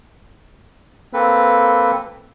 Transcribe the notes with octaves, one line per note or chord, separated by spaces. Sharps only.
A#3 C4 A4 B4